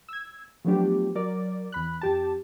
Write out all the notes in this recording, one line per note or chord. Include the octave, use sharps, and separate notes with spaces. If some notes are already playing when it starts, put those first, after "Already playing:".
E6 G#6
F3 F#3 A3 B3 D4 G4
F#3 A#4 D5
E2 B5 F#6
F2 G4 A5